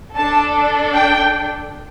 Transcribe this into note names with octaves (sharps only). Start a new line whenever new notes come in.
D4 A4 A5
G5